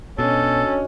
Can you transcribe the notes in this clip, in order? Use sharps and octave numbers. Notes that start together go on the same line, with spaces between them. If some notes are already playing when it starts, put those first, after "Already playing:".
B2 C#4 D4 F#4 A4 D#5